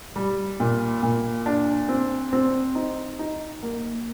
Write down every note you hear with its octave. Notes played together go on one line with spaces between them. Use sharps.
G3
A#2
A#2
D4
C4
C4
D#4
D#4
A#3